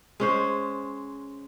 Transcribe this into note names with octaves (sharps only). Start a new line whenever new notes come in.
G#3 C#4 C5